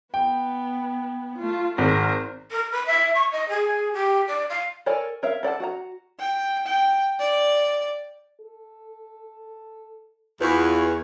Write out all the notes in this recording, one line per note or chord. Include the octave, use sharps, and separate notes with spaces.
B3 G5
A3 F4
G#1 A#4 C5
A#4
B4
E5
C#6
D#5
G#4
G4
D5
F5
A4 A#4 C#5 D5 G#5
A#4 C#5 E5 F5
A4 D5 F#5 A5
F#4 F#5 A#5
G5
G5
D5
A4
E2 F4 B4 C#6 G#6